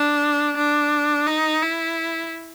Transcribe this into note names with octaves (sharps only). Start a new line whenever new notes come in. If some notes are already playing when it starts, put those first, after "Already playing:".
Already playing: D4
D4
D#4
E4